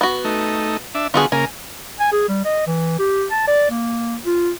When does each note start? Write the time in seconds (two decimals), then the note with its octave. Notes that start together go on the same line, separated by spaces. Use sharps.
0.01 B3 F#4
0.24 A3 D#4
0.95 D4 E5
1.14 D3 B3 F4 F#4 G#4 C#6
1.32 C#3 A#3 A#4 G#5
2.00 G#5
2.12 G#4
2.29 G3
2.45 D#5
2.67 E3
2.99 G4
3.31 A5
3.48 D5
3.71 A#3
4.26 F4